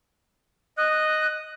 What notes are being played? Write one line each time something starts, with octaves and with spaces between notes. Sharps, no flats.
D#5 F#6